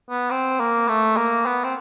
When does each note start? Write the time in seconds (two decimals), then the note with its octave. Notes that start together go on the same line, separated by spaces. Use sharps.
0.10 B3
0.31 C4
0.60 A#3
0.88 A3
1.17 A#3
1.46 B3
1.64 C4